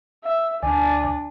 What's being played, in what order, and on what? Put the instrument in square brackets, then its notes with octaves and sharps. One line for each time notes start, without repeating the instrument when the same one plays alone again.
[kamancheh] E5
[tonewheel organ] D2 D5 [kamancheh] D4 [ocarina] G#5